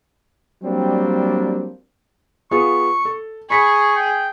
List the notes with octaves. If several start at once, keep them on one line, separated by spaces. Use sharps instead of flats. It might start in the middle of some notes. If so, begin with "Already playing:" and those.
F#3 G3 A#3 C4 D4
B3 F4 G#4 C#6
A4
G#4 B5 C#6 B6 C#7
G5